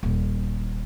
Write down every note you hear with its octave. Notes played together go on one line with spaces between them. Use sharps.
D#1